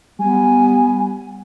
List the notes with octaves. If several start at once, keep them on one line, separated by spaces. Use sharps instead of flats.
G3 B3 G#5